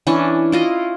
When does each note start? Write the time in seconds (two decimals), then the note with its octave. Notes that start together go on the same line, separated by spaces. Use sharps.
0.07 E3 C#4 D4
0.52 E4 F4 D#5